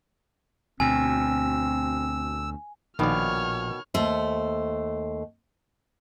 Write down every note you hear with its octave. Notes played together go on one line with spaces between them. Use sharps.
D2 B2 C4 G#5 E6
A#1 B2 D#3 F3 C#5 D5 F6
D#2 A3 C5